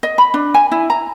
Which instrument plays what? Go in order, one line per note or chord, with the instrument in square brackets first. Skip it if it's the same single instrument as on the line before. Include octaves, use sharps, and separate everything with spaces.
[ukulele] D#5
B5
D4
G#5
E4
A#5